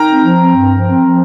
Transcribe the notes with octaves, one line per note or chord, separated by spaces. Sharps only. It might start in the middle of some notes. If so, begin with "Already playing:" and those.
Already playing: D#4 A#4 G5 A#5
C4
F3
C4
G2
F3
C4
F3